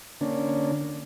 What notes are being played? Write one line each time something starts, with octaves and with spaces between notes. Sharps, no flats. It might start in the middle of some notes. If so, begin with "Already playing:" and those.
D3 A#3 C#4 D4